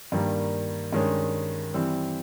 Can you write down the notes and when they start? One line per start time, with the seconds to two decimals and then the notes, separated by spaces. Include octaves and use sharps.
0.12 G2 D#3 G3 A#3
0.92 G2 D#3 G#3 C#4
1.74 E3 G3 C4